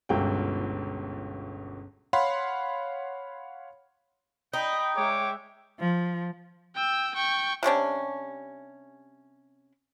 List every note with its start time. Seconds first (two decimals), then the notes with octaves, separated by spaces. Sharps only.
0.09 G1 C#2 B2 G5
2.13 C#5 F5 F#5 B5 C6
4.54 D#4 G5 B5
4.96 G#3 C#5 E5 G5 D6
5.80 F3
6.76 G5 E6
7.15 G5 C#6
7.63 C3 G3 C#4 D4